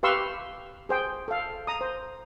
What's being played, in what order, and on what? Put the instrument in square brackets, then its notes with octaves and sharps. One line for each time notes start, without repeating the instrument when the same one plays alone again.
[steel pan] G4 B4 F5 C6 C#6 E6
G#4 C5 G5
A4 F5
A#5 D#6
C5